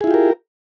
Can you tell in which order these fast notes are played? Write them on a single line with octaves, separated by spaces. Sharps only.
G#4 E4 F4 G4 A#4